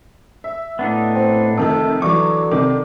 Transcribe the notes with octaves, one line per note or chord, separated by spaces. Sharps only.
E5
A2 B3 D4 D#4
C4
F1 C3 D#3 D#4 A4
D3 E3 F#3 C#6 D6
C3 D#3 D#4 D6